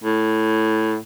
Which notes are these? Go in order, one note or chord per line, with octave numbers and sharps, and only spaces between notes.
A2